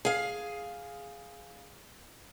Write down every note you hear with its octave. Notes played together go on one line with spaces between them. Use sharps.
G#4 F5